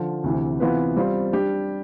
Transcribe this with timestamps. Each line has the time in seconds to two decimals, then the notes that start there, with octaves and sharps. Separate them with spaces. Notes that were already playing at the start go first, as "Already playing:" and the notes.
Already playing: D3 F3
0.24 D2 C3 E3
0.60 C3 E3 B3 F4 B4
0.96 G3 C4 F4 C5
1.33 G3 D4 G4